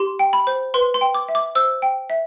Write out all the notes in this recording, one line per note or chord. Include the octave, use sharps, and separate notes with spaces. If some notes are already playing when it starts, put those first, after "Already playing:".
Already playing: G4 C6
G5
B5
C5
B4 C6
C6
G5
D6
E5
D6
C5 E6
G5
E5